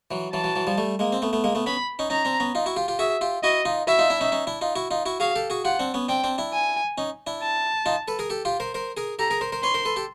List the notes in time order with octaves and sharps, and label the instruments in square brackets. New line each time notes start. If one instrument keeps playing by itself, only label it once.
[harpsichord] E3 F#3
[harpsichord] E3 F#3 [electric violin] A5
[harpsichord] E3 F#3
E3 F#3
F3 G3
G3 A3
G#3 A#3
C4
A3 B3
A3 B3
G#3 A#3
A3 B3
[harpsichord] B3 C#4 [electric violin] B5
[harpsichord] C#4 D#4
[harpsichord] C#4 D#4 [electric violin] A#5
[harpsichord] C4 D4
B3 C#4
D#4 F4
E4 F#4
F4 G4
F4 G4
[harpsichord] F#4 G#4 [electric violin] E5
[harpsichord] F4 G4
[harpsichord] E4 F#4 [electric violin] D#5
[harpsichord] D#4 F4
[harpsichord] E4 F#4 [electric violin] E5
[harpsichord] D#4 F4
D4 E4
C#4 D#4
C#4 D#4
D4 E4
D#4 F4
E4 F#4
D#4 F4
E4 F#4
[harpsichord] F#4 G#4 [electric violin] F5
[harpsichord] G4 A4
F#4 G#4
[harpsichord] F4 G4 [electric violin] F#5
[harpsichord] C4 D4
B3 C#4
[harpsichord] C4 D4 [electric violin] G5
[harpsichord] C4 D4
D4 E4
[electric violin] G#5
[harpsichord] C#4 D#4
D4 E4
[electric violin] A5
[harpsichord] D#4 F4
A4 B4
G#4 A#4
G4 A4
F4 G4
A#4 C5
A#4 C5
G#4 A#4
[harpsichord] G4 A4 [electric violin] A#5
[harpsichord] G#4 A#4
A#4 C5
A#4 C5
[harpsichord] B4 C#5 [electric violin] C6
[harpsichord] A#4 C5
A4 B4
G4 A4